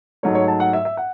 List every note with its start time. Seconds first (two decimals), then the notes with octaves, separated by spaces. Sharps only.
0.23 G#2 F#3 A3 C#5
0.35 C#5
0.48 A5
0.60 F#5
0.73 E5
0.85 E5
0.97 F#5